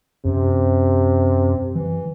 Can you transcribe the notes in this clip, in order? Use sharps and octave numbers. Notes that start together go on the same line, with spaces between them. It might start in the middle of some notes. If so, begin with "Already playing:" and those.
F#2 C3
E3